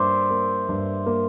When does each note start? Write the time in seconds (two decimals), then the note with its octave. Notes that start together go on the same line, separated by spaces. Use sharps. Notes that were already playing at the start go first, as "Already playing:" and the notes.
Already playing: G2 A#3 C5 D5 E5
0.31 A#3
0.69 G2
1.06 A#3